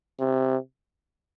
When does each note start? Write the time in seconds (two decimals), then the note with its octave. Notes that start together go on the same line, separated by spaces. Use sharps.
0.19 C3